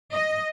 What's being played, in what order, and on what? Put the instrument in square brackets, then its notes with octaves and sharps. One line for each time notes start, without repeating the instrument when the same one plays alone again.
[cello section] D#5